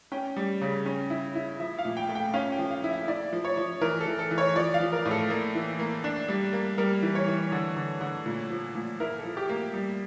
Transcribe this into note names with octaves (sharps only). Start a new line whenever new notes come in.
C#4 G5
G3
C#3
C#4
E4
E4
F3 E5
F5
A#2
G5
A3
G5
C#4 F5
G5
F3
F5
E4
E5
E4 D5
F3
C#5
F3
E3 A#4
A4
E3
A4
E3
C#5
F3 D5
F5
F3
A#4
A2
A4
A#3
E3
A#3
D4
G3
A#3
G3 A#4
E3
C#5
E3
D3
D3
D3
A#2
F3
A#2
E4 A#4
A4
F3
G4
A#3
G3